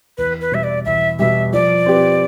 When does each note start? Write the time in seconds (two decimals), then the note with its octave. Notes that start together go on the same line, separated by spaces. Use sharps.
0.18 E2 B4
0.41 B4
0.52 B2 G3 E5
0.63 D5
0.85 E2 E5
1.19 B2 G3 E5
1.53 F3 D5
1.86 C4 G4 B4